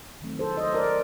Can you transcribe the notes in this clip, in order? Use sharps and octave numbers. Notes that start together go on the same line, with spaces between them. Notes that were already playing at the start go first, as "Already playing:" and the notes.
D#3 F#3 A3 C4
A4 C5
C5 D#5
A#4 D5